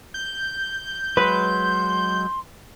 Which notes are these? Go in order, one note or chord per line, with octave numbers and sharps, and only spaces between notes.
G6
F#3 G#3 B4 C6